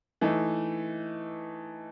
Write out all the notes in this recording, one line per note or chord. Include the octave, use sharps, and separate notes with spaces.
E3 A3 D#4